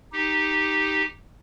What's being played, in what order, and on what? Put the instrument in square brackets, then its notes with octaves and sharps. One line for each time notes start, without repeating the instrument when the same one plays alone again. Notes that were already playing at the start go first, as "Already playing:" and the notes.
[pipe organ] D#4 G4